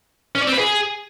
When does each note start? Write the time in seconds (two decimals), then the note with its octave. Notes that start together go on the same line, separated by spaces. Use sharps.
0.35 C#4
0.41 D5
0.47 C4
0.53 B4
0.58 G#4